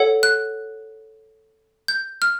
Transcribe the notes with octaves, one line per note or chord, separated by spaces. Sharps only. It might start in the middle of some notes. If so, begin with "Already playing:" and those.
Already playing: A4 C#5 F#5
F#6
G6
F6